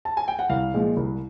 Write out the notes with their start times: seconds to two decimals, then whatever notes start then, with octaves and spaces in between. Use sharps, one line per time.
0.05 A5
0.17 G#5
0.28 G5
0.39 F#5
0.50 C2 F5
0.74 A#2 F3 G#3
0.97 C2